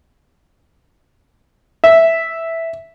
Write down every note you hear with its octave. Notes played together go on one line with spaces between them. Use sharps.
E5